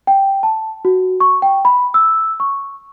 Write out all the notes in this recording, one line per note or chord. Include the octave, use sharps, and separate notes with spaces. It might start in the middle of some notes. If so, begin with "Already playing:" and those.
G5
A5
F#4
C#6
G5
B5
E6
C#6